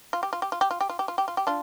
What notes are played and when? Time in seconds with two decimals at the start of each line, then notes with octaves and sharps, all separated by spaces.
0.13 F4
0.23 G4
0.33 F4
0.42 G4
0.52 F4
0.61 G4
0.71 F4
0.81 G4
0.89 F4
0.99 G4
1.08 F4
1.18 G4
1.28 F4
1.37 G4
1.47 D4 F4